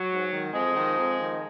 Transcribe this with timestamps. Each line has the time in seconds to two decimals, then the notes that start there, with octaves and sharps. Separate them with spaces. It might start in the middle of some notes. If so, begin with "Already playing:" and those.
Already playing: F#3
0.09 G#2
0.30 D#3
0.53 F2 F3 G#3
0.75 D#3
0.97 F2
1.19 D#3